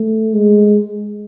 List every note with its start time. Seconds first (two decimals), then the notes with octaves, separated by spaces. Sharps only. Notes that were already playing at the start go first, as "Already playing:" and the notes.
Already playing: A3
0.34 G#3